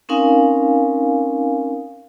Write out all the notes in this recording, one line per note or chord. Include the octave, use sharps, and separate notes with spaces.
C4 C#4 D#4 A#4 F5 G#5